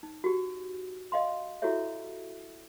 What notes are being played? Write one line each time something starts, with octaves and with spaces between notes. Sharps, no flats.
D#4
F#4 G4
D#5 F5 C6
E4 F#4 G4 A4 C#5 E5